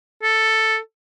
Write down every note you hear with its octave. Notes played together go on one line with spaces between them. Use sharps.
A4